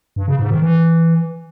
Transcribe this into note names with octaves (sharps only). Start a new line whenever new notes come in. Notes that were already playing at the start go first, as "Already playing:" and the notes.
G2
C#3
G#2
D#3
E3